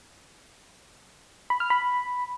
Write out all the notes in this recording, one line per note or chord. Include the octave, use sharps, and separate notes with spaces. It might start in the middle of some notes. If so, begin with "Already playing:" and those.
B5
F6
B5